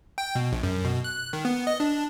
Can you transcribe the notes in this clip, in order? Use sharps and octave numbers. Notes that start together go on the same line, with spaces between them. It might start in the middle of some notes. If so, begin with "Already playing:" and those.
G5
B2
A#1
F#2
B2
F#6
D#3
B3
D#5
D4